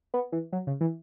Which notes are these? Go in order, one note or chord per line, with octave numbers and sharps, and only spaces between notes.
B3
E3
F#3
C#3
E3